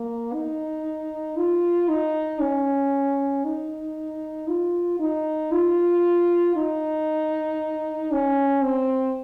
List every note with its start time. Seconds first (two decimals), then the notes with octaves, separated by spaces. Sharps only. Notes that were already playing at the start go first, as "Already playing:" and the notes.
Already playing: A#3
0.33 D#4
1.37 F4
1.88 D#4
2.40 C#4
3.44 D#4
4.48 F4
4.99 D#4
5.52 F4
6.56 D#4
8.12 C#4
8.62 C4